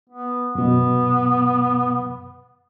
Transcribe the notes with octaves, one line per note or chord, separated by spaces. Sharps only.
B3
F#2 B2 B3